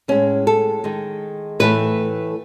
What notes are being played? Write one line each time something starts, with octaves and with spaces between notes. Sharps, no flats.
A2 G#3 C#4
A4
D#3 G#3
A2 E3 A3 B4